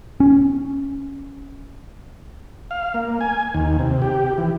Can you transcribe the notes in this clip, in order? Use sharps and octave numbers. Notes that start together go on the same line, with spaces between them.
C#4
F5
A#3
G#5
D#2
C3
G4
E3